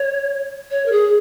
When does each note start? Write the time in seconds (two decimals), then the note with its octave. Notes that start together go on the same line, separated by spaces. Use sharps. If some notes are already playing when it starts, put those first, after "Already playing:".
Already playing: C#5
0.71 C#5
0.86 A#4
0.92 G#4